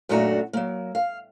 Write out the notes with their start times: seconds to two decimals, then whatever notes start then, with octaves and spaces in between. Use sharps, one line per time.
0.09 F#2 A#2 A3 D4 F#4 A#5
0.53 F#3 A#3
0.95 F5